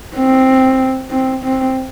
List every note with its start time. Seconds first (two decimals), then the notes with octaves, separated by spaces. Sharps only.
0.16 C4
1.11 C4
1.44 C4